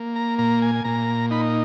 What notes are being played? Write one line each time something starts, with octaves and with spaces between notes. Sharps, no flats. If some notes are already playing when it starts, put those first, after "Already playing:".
Already playing: A#3
A#5
A#2 A#5
G#5
A#2 A#5
D#4 B5